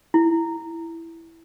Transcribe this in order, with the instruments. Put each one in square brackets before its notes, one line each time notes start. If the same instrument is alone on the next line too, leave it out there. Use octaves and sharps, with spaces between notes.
[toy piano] E4